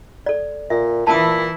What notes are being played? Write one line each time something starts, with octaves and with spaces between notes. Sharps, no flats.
A4 D5
A#2 E5
A#2 E3 E4 A5 D#6